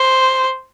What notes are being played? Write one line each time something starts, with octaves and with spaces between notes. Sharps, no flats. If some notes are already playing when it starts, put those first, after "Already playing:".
Already playing: C5